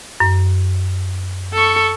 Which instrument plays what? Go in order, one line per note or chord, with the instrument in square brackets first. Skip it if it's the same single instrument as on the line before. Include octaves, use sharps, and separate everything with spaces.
[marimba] F#2
[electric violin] A4 C#6